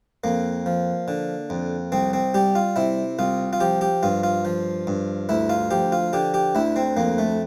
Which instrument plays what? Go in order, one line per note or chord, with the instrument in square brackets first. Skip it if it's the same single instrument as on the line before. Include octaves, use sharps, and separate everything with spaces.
[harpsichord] F2 A#3
F3
D3
F2
C2 C4
C4
G3 G4
F4
C3 E4
C2 F4
F4
F3 G4
G4
G2 F4
F4
F3
G2
D2 E4
F4
F3 G4
F4
D3 G4
G4
D2 E4
C4
F2 A#3
A3